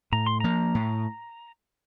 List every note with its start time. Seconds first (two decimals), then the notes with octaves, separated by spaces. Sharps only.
0.12 A2 A#5
0.26 C6
0.40 F3 A#3 A#5
0.75 A2